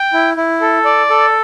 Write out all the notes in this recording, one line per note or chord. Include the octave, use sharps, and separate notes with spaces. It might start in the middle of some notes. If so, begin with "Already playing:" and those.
Already playing: G5
E4
E4
A4
D5
A4